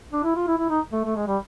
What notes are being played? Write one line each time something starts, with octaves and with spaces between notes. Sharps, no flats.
D4
E4
F4
E4
E4
D#4
A3
A3
G#3
G3